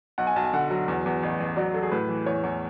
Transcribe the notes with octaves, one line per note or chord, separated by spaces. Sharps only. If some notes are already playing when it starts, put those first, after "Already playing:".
B1 F#5
G#5
B1 A5
G#5
D3 F#5
F#3
E2
E2
A1
A1
F#3 D5
F#3 A4
G#4
A2 B4
E3
E2 C#5
E2